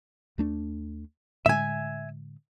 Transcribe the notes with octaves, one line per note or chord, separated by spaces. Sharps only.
D#2 A3 D4
A2 D3 G#3 E5 G#5